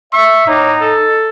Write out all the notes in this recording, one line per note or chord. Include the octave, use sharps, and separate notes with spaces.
E5 C#6
A2 A#3 D#4
A4